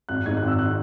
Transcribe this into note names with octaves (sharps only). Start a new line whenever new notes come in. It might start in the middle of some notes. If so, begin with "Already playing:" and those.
G#1 F#6
G#2 D#3 G#6
F#6
G#1 E6
D#3 F#6